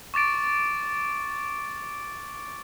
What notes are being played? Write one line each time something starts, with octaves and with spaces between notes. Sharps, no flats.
C#6 D6 A6 D7